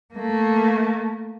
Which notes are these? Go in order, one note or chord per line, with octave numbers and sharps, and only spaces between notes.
A3 A#3